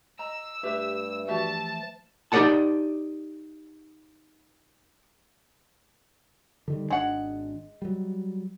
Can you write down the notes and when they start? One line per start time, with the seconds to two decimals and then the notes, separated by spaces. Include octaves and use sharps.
0.19 D#5 A#5 E6
0.63 G2 A3 G4 B4 E5
1.28 E3 F3 A3 F#4 G4 E5 A5
2.32 D#4 G4 A#4 D5 F#5 A5
6.68 D3 D#3 G3
6.90 G#1 G#3 D4 F#5
7.82 F#3 G3